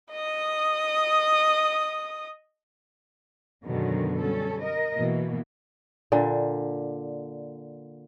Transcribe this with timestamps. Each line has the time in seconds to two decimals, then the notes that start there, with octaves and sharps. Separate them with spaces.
0.12 D#5 D#6
3.65 F#2 B2 D3 D#3 F#3 G#3
4.19 G3 C#4 A4
4.62 A#4 D#5
4.97 B2 E3 A#3
6.12 A#2 D3